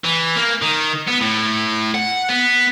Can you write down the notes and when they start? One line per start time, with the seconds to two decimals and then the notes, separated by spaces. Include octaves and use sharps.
0.04 E3
0.36 A#3
0.62 D#3
1.07 B3
1.21 A2
1.94 F#5
2.29 B3